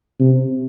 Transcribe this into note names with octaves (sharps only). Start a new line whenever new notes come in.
C3